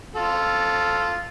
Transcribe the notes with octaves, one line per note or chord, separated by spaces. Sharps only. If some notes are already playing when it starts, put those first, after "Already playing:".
F4 A4